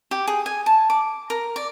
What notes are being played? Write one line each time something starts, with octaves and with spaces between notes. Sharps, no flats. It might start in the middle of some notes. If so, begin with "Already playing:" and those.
G4
G#4
G#5
A5
D6
A#4
D5